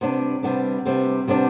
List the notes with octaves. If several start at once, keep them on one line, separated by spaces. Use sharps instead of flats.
C3 G3 B3 D4
C3 G3 B3 D4
C3 G3 B3 D4
C3 G3 B3 D4